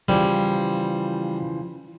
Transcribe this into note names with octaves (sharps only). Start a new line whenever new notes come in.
C#3 E3 F3 G3